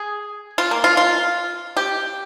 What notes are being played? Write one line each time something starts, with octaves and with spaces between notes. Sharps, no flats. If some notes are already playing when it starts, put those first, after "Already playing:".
Already playing: G#4
F4
A#3
F4
F4
G4